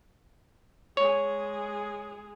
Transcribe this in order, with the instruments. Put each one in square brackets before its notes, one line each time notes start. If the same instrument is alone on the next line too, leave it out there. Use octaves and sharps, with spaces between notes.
[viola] G#3 G#4 [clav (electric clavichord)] C#5